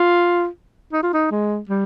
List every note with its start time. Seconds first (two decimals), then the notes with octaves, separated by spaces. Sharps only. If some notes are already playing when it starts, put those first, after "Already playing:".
Already playing: F4
0.93 D#4
1.03 F4
1.14 D#4
1.31 G#3
1.69 G3